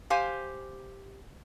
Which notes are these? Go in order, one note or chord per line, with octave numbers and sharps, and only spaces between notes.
G4 C5 F5 G#5